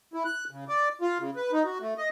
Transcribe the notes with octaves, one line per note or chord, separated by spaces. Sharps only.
E4
F#6
C#3
D5
F4
C#3
B4
D#4
F#4
A3
D#5